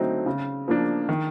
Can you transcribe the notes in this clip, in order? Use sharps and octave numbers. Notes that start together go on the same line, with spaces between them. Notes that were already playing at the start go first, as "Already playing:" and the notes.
Already playing: D3 F#3 A3 C4 D#4
C#3
F3 A#3 D4
D#3